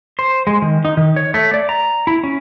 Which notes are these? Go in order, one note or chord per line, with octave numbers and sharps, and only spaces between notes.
C5
G#3
D#3
D#4
D#3
C#5
A3
D5
A#5
E4
C#4